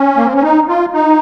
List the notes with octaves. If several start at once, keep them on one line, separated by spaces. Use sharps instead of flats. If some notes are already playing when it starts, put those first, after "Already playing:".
Already playing: C#4
A#3
C4
C#4
D#4
F4
D#4